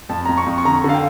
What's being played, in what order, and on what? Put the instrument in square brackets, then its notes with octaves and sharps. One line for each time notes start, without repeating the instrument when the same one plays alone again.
[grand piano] F2 A5
F2 A#5
C#6
F2
C#6
D3 A#5
D3 F5
G5